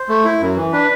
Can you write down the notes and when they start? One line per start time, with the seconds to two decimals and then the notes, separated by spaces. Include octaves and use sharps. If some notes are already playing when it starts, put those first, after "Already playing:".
Already playing: C5
0.09 A3
0.25 E4
0.41 F#2
0.56 E3
0.72 D4 B4